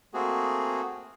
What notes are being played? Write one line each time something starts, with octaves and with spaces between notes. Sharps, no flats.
A3 A#3 C4 F#4 G#4